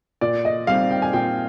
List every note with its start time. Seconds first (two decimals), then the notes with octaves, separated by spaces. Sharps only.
0.21 A#2 D5
0.45 D#5
0.67 G3 C4 D#4 F5
0.91 G5
1.02 G#5
1.13 A#2 G5